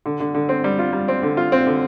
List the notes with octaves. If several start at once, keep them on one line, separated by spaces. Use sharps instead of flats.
D3
D3
D3
C4
G3
F4
G3
C4
D3
F4
C4
D3